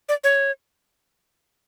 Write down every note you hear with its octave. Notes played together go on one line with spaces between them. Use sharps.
D5
C#5